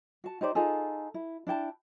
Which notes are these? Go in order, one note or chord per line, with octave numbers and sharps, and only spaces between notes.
F#4 A5
D#4 G4 C5 D5
D#4 F4 G#4 A4
E4
D4 E4 G5 A5